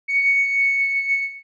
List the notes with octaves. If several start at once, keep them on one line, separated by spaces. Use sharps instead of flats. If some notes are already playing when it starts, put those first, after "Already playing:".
C#7